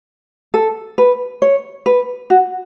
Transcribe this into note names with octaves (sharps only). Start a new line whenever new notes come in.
A4
B4
C#5
B4
F#4